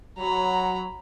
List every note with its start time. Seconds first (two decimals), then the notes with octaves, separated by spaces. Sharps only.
0.18 F#3 A#5 B5